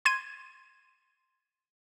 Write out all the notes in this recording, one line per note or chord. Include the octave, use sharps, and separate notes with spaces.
C6 G#6 D#7